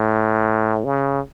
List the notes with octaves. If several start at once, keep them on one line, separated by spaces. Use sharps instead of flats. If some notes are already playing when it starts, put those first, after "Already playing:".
Already playing: A2
C#3